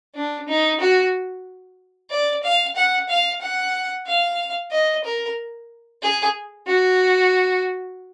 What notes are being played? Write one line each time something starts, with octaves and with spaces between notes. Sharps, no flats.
D4
D#4
F#4
D5
F5
F#5
F5
F#5
F5
D#5
A#4
G#4
F#4